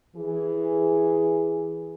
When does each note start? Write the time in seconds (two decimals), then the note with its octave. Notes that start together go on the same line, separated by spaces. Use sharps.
0.16 E3 G#4